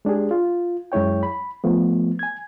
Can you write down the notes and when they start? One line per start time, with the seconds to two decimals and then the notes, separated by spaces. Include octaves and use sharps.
0.05 G#3 D4 G4 G#4
0.31 F4
0.92 F#2 G#3 E4 C#5 G5
1.23 B5
1.64 F3 A3 B3
2.19 G#5 G#6